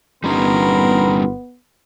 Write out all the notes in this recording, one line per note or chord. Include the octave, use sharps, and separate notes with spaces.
G1 G3 B3 C#4 D#4 A#4 B5 C6